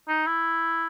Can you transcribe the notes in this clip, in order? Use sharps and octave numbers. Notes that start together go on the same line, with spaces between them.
D#4
E4